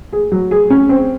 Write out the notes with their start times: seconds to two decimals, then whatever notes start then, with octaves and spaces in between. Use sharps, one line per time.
0.13 G#4
0.32 F#3
0.51 G#4
0.70 C#4
0.89 C4